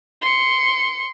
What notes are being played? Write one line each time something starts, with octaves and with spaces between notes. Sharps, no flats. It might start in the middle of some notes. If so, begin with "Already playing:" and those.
C6 C#7